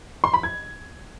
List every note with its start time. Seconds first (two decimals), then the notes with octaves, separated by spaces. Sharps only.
0.24 C6
0.34 B5
0.43 G#6